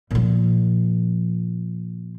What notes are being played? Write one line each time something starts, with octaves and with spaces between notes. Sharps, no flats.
A#2 F3